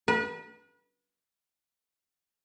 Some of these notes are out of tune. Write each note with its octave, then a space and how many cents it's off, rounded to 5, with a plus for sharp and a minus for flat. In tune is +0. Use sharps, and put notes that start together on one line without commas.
B4 -35